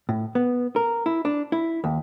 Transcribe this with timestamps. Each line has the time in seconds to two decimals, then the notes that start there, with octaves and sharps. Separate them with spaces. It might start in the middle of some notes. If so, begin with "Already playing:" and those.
0.09 A2
0.35 B3
0.76 A#4
1.06 E4
1.25 D4
1.52 E4
1.84 D#2